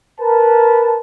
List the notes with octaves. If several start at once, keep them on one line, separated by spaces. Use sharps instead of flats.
A#4 B4 A5